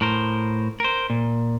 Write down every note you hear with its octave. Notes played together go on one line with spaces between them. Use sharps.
A2 A#4 C5
A#4 C5
A#2